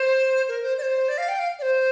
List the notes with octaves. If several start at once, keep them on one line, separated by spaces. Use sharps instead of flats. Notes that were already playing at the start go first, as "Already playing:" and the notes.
Already playing: C5
A#4
C5
D5
C5
D5
F5
G5
F5
D5
C5